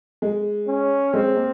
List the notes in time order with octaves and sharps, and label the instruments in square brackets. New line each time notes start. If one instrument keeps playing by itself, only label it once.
[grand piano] G#3
[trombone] C#4
[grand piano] G#3 [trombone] C4
[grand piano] A#3